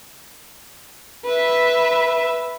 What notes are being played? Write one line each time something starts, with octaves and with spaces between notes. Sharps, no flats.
B4 E5